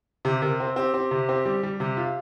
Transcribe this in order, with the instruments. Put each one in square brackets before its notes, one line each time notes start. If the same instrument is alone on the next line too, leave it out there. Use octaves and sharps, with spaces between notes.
[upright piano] C3 [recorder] G4
[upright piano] C3 [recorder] A#4
[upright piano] C4
[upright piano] C4 [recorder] G4
[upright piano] C4
C3
C4
G3
G3
[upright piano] C3 [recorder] G4
[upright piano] F4